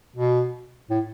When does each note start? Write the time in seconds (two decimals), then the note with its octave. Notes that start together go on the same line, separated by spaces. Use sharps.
0.16 B2
0.90 A2